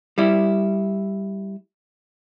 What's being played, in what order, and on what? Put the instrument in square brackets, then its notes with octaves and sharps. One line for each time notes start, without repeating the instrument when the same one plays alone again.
[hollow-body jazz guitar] G3 E4